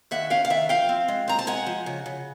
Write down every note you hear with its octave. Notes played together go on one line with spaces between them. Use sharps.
D#2 E5 F#5
C#4 F5 G5
F5
D#3 E5 F#5
F3 F5 G5
C4
G#3
C4 A#5
A5
G#3 F#5 G#5
F3
C#3
C#3